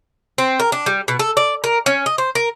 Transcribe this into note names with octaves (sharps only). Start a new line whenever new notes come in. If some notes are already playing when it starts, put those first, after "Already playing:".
C4
A#4
D4
G3
B2
A4
D5
A#4
C#4
D#5
C5
A#4